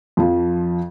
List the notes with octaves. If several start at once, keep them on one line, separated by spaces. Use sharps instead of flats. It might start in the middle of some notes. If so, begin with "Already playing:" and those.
F2 F3